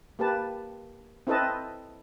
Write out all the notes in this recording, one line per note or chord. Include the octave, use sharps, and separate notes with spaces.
A#3 G4 B4 A5
C4 E4 A4 B4 D#5 A5